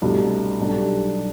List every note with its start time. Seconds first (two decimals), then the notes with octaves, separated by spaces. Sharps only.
0.02 C2 B2 A3 D4
0.59 B1 B2 G3 D4 A4